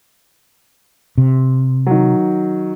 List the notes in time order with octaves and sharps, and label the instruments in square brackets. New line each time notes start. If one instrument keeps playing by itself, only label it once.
[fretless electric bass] C3
[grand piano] D#3 F#3